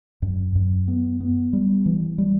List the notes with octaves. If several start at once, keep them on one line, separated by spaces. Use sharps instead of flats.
F#2
F#2
B3
B3
G3
E3
G3